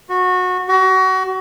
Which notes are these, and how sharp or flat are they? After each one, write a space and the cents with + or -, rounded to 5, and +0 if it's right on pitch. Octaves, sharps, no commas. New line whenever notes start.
F#4 -20
F#4 +30